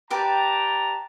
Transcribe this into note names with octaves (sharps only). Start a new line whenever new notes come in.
G4 B4 D5 G5 A5 A#5